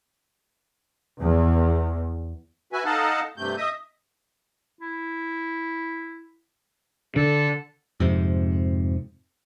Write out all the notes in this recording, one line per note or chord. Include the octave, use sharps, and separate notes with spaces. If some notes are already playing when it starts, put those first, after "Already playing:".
E2
F#4 B4 E5 G#5
D#4 A4 D#5 F5 F#5 A5
G2 C3 A3 G6
D#5 E5 D#6
E4
D3 A4
F2 G#2 C3